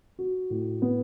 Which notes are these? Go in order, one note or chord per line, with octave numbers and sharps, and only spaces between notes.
F#4
A2
B3